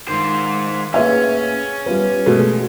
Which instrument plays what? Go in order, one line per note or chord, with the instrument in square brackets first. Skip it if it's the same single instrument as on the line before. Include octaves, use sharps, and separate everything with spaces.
[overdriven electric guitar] G#2 C5 [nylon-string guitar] D#3 F4
[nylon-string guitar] A2 A#3 F#5 [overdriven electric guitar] C#4 [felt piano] G#4 B4 E5
[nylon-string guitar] G3 B3 [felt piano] F4 B4
[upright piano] B2 G#3 A3